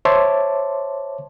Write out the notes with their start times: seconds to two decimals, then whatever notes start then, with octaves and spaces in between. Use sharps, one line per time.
0.05 C5 C#5 E5 A5 C6 D6